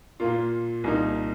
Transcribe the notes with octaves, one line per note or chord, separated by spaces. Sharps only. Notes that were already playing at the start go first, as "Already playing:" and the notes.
A#2 A#3 F4
C2 A#2 A#3 D#4